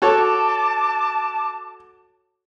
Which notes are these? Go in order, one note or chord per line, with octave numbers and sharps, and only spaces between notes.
F#4 A4 C#5 A5 D6